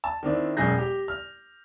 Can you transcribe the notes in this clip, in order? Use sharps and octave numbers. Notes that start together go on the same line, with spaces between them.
A5
D#3 C4 D4 E4
E1 F#2 G#4 G6 A#6
G4
F6